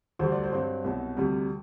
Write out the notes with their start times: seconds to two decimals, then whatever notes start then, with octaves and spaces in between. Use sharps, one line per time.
0.19 D2 D3 G3 C5
0.32 D5
0.43 C5
0.52 G2 F#3 C4
0.84 C2 B2 F#3
1.17 D2 C3 G3